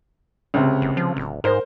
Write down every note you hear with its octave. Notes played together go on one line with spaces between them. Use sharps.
C#2 C3
F#1
F3
D1
G#2 A#4 C5